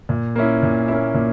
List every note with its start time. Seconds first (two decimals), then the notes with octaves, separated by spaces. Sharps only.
0.09 A#2
0.36 A#3 C#4 E4
0.63 A#2
0.88 A#3 C#4 E4
1.14 A#2